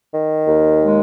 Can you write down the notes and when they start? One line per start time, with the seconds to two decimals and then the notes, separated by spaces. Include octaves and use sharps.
0.12 D#3
0.48 D#2
0.82 G#3